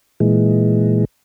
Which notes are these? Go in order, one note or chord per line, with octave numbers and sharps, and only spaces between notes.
A#2 E3 G#3